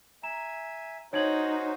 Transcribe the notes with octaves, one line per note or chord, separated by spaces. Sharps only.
E5 G#5 A#5 E7
C#4 D#4 F#4 C5 C#5 G#6 F#7